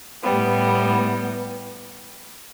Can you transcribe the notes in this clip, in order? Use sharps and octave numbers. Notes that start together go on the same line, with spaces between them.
A2 G3 B3